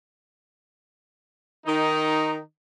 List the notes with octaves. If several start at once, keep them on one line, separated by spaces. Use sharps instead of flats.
D#3 D#4